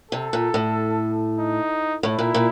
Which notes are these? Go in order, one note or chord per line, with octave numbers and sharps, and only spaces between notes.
C3 A4
A#2
A2
D#4
A2 E4
A#2
A#2